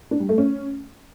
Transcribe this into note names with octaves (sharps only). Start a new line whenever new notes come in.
D4
G3
A3
C#4